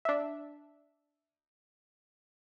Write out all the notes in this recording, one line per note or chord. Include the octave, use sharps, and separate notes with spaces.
D4 E5